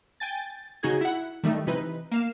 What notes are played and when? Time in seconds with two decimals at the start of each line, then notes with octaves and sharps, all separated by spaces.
0.20 G5 G#5 A6
0.83 C#3 D#4 F#4 G#4 G#6
1.01 E4 F#5
1.44 D#3 G3 A3 D#4
1.67 C3 E3 D#4 B4
2.11 A#3 F5 E7